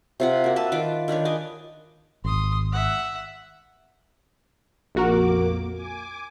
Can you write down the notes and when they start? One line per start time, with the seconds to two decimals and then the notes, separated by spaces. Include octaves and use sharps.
0.20 C3 F4 F#5
0.44 A#3 F#4
0.56 B4 E5 A5
0.72 D#3 F4 B4 D6
1.08 D#3 D4 B4 C#5
1.25 D#5 G#5 D6
2.24 G#1 C6 D#6
2.72 E5 F#5
4.95 A#1 F2 A#3 F#4 A#4 D6
5.73 G#5 D6